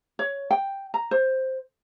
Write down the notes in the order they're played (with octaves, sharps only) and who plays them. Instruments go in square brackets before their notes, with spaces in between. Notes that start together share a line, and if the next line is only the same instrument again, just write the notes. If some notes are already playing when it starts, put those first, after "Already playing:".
[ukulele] C#5
G5
A#5
C5